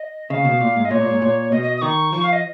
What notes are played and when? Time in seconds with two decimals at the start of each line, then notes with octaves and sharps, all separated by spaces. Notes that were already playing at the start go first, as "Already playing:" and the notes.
Already playing: D#5
0.30 C#3 F5
0.45 B2
0.61 A#2
0.76 G#2
0.85 D#5
0.90 A#2 C#5
1.01 A#2
1.11 G#2
1.22 A#2
1.52 B2 D#5
1.62 D#5
1.77 D#6
1.82 D#3 C#6
2.13 F3 C#6
2.23 F5
2.32 D#5